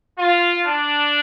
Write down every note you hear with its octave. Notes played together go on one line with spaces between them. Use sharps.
F4
D4